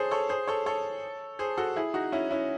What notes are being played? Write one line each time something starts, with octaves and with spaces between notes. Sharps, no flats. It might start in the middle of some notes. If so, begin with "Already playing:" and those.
Already playing: G#4 A4 C5 C#5
A4 C#5
G#4 C5
A4 C#5
A4 C#5
G#4 C5
F#4 A4
E4 G#4
D#4 F#4
C#4 E4
C#4 E4